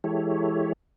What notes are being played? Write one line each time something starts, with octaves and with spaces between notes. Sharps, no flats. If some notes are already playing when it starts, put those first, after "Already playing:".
E3 G#3 E4 G4 A4 C#5